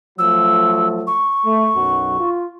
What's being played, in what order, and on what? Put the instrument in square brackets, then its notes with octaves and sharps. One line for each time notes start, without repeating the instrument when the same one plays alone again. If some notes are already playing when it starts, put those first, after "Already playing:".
[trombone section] F3 F#3 A3 [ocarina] E6
[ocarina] C#6
[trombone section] A3
B1 F#2 F#4
F4